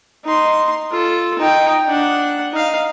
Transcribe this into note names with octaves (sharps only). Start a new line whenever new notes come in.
D#4 C6
F4 A4
D#4 G5
D4 F#5
D#4 F5